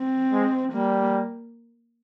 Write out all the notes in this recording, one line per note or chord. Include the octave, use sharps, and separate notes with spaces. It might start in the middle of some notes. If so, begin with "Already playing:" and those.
Already playing: C4
G#3
G3 A#3